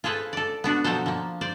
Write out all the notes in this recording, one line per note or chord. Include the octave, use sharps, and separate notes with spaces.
F4 G#4 A4 B4 C5
A4 D5
B3 D4 F#4
B2 F3 F#3 A4 C5
F3 A#3
C5 D5